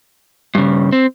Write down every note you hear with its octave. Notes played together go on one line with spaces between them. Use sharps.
G2 C#3
C4